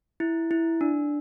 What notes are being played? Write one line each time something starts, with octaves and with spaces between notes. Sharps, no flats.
E4
E4
D4